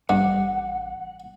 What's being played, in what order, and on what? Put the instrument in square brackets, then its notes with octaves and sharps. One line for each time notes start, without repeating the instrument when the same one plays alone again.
[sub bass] A1 [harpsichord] G2 [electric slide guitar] F#5